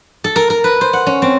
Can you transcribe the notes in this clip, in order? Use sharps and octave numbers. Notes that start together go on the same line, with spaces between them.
A4
A#4
A#4
B4
C5
F#5
C#4
C4